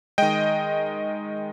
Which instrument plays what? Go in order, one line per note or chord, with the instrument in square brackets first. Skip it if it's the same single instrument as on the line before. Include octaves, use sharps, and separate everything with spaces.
[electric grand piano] D#3 G#3 D#5 G5